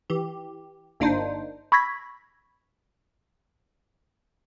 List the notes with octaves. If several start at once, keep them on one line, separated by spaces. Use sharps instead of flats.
E3 G4
G1 A#3 D4 D#4 C5
B5 C#6 E6 G#6 A#6 B6